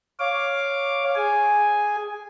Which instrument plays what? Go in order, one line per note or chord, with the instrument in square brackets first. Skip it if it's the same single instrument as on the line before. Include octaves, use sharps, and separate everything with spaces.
[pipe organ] C#5 F5 D6
G#4 G#5